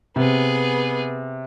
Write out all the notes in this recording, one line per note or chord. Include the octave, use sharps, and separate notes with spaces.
C3 B3 G#4